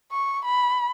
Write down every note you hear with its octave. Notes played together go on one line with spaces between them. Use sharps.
C#6
B5